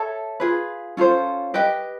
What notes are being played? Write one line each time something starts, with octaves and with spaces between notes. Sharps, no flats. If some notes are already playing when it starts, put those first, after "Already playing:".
Already playing: A4 C#5 E5 A5
F4 G#4 B4
C#4 F4 A4 C5
G4 B4 D#5 G5